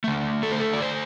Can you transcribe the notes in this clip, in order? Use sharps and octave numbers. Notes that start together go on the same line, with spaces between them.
D3 A3
A4
C5
A4
D5
C5